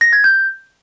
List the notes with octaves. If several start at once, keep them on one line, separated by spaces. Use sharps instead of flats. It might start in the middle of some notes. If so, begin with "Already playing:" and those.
A#6
G#6
G6